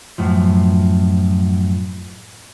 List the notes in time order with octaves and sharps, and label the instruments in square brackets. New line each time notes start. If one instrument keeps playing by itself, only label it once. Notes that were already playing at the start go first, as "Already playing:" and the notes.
[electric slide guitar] F#2 A2 F3